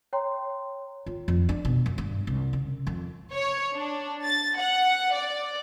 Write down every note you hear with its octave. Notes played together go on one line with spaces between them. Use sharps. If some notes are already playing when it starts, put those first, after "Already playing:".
C#5 G5 A#5 C6
F4
F2
D4
B2
F#2
G2
C2
C#3
F2
C#5
D4
A6
F#5
D5